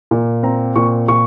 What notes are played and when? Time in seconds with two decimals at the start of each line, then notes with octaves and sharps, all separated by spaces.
0.11 A#2
0.43 C4 A#5
0.76 A#2 C#6
1.08 A#2 C#6